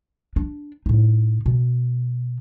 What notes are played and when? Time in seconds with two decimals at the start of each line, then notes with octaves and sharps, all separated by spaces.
0.36 D4
0.86 A2 D#4
1.46 B2